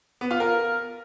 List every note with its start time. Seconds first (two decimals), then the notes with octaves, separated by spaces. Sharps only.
0.21 B3
0.31 F4
0.40 A#4